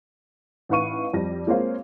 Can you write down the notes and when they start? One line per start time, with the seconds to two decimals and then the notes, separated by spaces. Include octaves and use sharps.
0.69 A1 D#4 B4 F5 C#6 D#7
1.13 F2 G3 A#6
1.47 G#3 A#3 C4 F4 C#5 F5